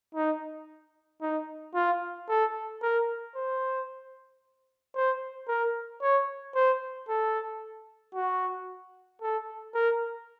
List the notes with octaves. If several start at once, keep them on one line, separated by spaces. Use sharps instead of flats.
D#4
D#4
F4
A4
A#4
C5
C5
A#4
C#5
C5
A4
F#4
A4
A#4